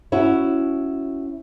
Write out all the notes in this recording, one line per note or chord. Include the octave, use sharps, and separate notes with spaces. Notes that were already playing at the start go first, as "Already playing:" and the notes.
C#4 E4 F#4